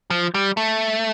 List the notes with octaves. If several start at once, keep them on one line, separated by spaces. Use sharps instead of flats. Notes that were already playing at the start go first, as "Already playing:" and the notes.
F3
G3
A3